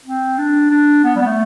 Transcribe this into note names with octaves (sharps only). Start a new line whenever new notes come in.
C4
D4
D4
B3
G3
B3
A3